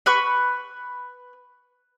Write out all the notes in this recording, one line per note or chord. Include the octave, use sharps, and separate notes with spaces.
B4 B5 C#6